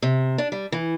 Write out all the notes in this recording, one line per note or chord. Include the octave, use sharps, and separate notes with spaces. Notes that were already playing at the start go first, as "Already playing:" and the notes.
C3
D4
G3
E3